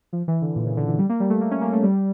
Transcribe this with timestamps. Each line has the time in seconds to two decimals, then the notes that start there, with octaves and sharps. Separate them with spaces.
0.13 F3
0.28 E3
0.42 D3
0.56 A#2
0.66 C#3
0.77 D3
0.88 E3
0.98 G3
1.09 A#3
1.20 G3
1.30 A3
1.41 A#3
1.51 C#4
1.61 A#3
1.73 A3
1.83 G3